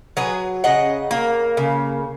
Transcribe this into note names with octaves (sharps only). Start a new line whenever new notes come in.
F#3 G#4 B4
C#3 D#5 F#5
A#3
C#3